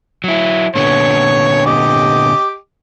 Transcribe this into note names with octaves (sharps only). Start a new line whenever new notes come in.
F#3 E4
A#2 D3 B3 C#5 C#6
G4 D#5 D6